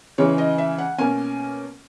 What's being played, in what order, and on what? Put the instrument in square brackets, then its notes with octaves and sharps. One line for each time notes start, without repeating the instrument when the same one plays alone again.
[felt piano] C#3 E3 G#3 C#5
D#5
E5
F#5
B2 A#3 C#4 G#5